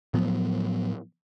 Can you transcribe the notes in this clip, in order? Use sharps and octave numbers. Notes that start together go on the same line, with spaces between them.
A2 F3 F#3 B3